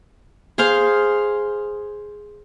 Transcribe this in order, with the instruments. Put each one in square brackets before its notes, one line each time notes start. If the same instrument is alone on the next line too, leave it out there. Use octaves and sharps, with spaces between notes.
[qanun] G#4 C5 F5 C6